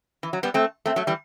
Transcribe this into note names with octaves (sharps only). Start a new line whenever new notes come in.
E3
F#3
G3 B3
A3 C4
A3 C4
F#3 A3
E3 G3